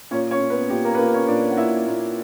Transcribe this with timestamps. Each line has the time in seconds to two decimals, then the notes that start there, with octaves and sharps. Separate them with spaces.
0.11 A#2 C#4 C#5
0.31 C#4 C#5
0.40 A#2
0.50 B3 B4
0.69 A#2 G4
0.84 A#3 A#4
0.95 B4
0.99 A#2 A#3 A#4
1.13 C#4 C#5
1.28 A#2 D4 D5
1.50 F#5
1.57 A#2 E4 E5
1.86 A#2